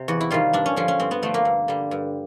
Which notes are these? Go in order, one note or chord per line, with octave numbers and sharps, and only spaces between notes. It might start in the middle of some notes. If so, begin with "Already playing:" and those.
Already playing: C3
E2 F#4
E4
C3 D#3 G3 F4
G2 D4
C#4
D3 F3 C#4
C#4
G2 C4
B3
D3 F3 A3
A#3
G2
D3 G3
G2